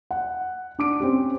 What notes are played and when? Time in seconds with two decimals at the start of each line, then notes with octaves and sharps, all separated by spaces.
0.11 F#5
0.79 D4 D6 D7
1.00 C4 C#4 G4